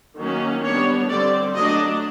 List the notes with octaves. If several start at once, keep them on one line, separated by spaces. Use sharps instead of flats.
D#3 F#3 A#3 C#4
G3 B3 D4 C#5
D3 G3 C4 D5
F#3 A3 D4 D#5